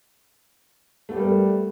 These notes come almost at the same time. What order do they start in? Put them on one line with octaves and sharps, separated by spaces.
A3 B3 G4 G3 A#4